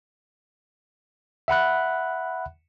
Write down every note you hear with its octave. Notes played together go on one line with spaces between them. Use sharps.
E5 F#5 B5 F#6